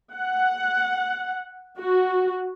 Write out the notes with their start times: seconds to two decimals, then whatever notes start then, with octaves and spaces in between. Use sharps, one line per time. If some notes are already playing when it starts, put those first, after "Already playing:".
0.14 F#5
1.79 F#4